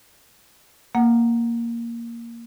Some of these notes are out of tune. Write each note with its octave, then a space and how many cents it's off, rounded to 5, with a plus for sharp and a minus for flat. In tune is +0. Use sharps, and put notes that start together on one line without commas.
A#3 +0 F#5 +0